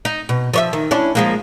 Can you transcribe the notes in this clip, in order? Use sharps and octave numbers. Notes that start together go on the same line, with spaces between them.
D#4
B2
F3 C#5 E5
D#3
C#4 D4 E4
F3 G#3 A#3